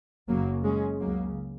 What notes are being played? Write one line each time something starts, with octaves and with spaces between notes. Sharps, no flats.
F#1 F#2 C#3 F#3 A#3
G#3 C#4
C#2 C#3 F#3 A#3